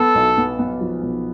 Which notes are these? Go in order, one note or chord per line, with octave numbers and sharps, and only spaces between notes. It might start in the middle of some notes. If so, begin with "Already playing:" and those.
Already playing: B3 A4
B1
B3
B3
F3
B1